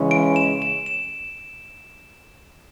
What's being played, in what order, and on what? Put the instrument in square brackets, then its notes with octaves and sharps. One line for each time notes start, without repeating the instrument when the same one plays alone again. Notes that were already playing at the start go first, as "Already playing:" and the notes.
Already playing: [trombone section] C#3 E3 G#3 C#4
[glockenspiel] D7
E7
E7
E7